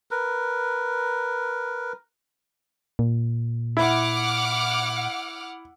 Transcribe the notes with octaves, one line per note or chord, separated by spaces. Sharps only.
A#4 B4
A#2
E4 F#5 D6 F6